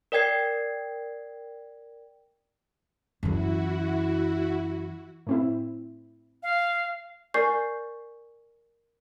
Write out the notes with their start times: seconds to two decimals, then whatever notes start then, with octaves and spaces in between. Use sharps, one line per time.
0.12 A#4 D5 G5 G#6 C7
3.23 F#2 E3 E4 F#4
5.27 A2 C4 E4
6.43 F5
7.34 A#4 D5 G#5 C#6 G6 C7